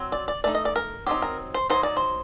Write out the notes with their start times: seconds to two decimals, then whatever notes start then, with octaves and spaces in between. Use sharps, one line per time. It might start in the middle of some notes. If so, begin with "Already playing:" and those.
Already playing: F#3 C4
0.12 D5
0.28 D5
0.44 A3 D#4 D5
0.55 D#5
0.65 D5
0.76 A#4
1.06 F#3 C4 D#4 G4
1.22 A#4
1.54 C5
1.70 F#3 C4 D#4 C5
1.83 D5
1.97 C5